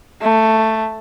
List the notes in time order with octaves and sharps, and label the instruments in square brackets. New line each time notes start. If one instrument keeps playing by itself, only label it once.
[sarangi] A3